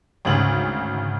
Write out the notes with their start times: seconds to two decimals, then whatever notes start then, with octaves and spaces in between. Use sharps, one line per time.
0.25 G#1 D2 C#3 F#7